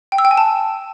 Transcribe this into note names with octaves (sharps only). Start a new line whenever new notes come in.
G5
E6
G5
G#5
A5